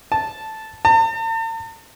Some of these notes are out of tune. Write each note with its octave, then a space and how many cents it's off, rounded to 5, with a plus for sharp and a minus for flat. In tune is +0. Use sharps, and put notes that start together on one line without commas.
A5 -5
A5 +45